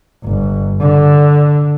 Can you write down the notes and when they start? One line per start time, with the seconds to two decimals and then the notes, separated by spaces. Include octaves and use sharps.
0.24 G1
0.80 D3